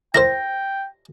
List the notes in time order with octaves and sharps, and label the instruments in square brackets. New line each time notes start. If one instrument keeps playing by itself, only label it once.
[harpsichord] E4 A#4 C5 [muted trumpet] G5 [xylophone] A#6